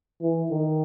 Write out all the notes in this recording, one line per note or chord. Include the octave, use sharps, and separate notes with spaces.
E3
D#3